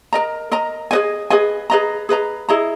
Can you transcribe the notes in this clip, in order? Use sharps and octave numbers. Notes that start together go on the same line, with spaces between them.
A#4 D#5 A#5
A#4 D#5 A#5
G#4 B4 D#5 G#5
G#4 B4 D#5 G#5
G#4 B4 D#5 A#5
G#4 B4 D#5 A#5
E4 G#4 D#5 A#5